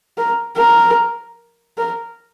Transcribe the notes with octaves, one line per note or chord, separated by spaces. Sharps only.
A#4
A#4
A#4